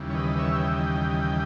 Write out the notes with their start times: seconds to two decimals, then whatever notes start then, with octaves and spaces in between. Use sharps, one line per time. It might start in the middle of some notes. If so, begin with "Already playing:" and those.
Already playing: D#2 C#3 E3 G3
0.10 C#5
0.14 B4 D#5
0.39 C#5 E5
0.55 D#5 G5
0.65 E5
0.73 D#5 G5